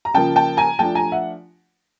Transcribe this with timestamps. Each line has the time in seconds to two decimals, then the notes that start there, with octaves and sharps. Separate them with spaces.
0.05 A#5
0.14 C#3 F3 A#3 G5 A5
0.36 G5 A5
0.57 G#5 A#5
0.79 F3 A3 D4 G5 A5
0.95 G#5 A#5
1.12 E5 F#5